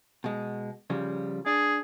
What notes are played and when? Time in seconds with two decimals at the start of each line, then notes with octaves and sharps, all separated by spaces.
0.24 B2 G#3
0.90 C#3 F3 G3
1.46 D4 G#4